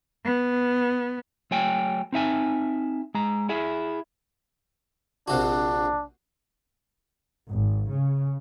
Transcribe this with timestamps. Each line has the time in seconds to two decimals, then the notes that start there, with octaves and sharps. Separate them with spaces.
0.24 B3
1.51 F#3 A3 C#5 G5 G#5
2.13 C4 D#4 E5 G#5
3.14 G#3 A#5
3.49 E4 G#4 E5
5.28 A#1 C3 D4 F#4
7.47 G#1
7.90 C#3